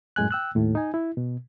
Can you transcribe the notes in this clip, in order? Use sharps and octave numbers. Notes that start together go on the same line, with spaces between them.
F#2 A2 G#3 G#5 F#6
G5 E6 F#6
D#2 A2
D#4 G#5
E4
B2